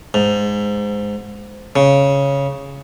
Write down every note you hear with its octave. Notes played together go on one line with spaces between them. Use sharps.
G#2
C#3